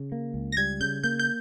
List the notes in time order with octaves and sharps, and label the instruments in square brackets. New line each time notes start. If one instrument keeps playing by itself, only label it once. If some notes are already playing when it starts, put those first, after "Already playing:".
Already playing: [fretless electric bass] C#3
A#3
C#2
[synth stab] A#6
[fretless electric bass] G3 [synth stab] G#6
[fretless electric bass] C#3 [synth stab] G6
[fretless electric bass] A#3 [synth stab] G6
[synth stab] G6